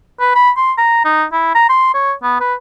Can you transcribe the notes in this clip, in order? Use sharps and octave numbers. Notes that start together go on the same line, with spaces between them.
B4
B5
C6
A#5
D#4
E4
A#5
C6
C#5
B3
B4